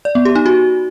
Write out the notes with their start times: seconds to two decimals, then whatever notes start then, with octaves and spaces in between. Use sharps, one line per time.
0.05 D5
0.15 B3
0.25 G4
0.36 D#4
0.46 F#4